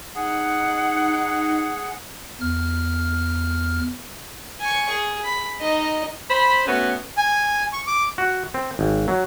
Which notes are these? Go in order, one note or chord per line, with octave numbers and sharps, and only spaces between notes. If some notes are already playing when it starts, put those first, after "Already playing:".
D#4 G#4 F#5
E2 F6
G#5 C#6
G#4
B5
D#4 D#5
C5 B5
A3 B3 C#4 F#4
G#5
C#6
D6
F#4
C4
G#1
F#3